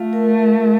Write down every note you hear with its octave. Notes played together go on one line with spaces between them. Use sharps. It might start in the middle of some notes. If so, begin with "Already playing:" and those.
Already playing: A3 F4 F5
A#4
A#4